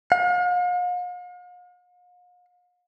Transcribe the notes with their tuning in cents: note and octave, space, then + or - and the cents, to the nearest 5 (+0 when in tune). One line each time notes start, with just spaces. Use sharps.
F5 +45